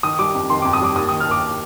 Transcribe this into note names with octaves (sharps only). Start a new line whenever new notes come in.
D#3 D#6
G3 D6
F2
D#3 C6
F2 D6
D#6
G3 D6
D#2 D#6
D#3 D#6
F6
D#2 D6